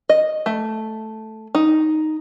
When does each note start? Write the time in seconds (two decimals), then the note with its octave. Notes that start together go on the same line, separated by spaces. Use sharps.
0.09 D#5
0.46 A3
1.55 D#4